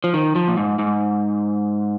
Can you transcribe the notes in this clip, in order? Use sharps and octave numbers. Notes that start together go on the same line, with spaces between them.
F3
D#3
F3
A#2
G#2
G#2